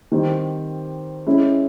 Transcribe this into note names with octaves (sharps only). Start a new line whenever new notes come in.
D#3 G3 C4
G#3 C#4 E4